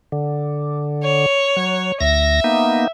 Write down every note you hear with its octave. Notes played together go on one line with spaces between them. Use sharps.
D3
C#5
F#3
D2 E5 A#6
A#3 B3 D#4